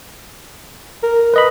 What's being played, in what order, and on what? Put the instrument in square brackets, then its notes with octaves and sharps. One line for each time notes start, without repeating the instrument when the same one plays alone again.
[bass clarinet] A#4
[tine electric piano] B4 D#5 B5